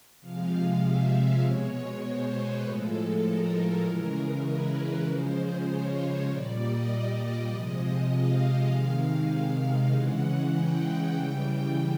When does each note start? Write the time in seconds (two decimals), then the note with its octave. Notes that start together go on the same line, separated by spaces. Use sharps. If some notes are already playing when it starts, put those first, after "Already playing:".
0.21 C3 F3 G#3 F5
0.81 E5
1.41 B2 G#3 C#5
2.02 C5
2.33 B4
2.63 A2 F3 G#3 A4
3.25 A#4
3.85 C#3 E3 G#3
4.45 B4
5.05 C#3 F3 G#3 C5
5.67 C#5
6.27 A#2 G3 D5
6.58 D#5
7.49 C3 F3 G#3
8.09 F5
8.70 C3 D#3 G#3
9.91 C#3 E3 G#3 F#5
10.53 G5
11.13 C#3 E3 G3 G5